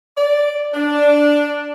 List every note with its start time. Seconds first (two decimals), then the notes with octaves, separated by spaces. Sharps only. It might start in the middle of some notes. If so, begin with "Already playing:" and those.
0.18 D5
0.74 D4